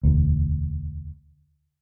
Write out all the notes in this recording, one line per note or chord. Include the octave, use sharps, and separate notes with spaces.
E1 D2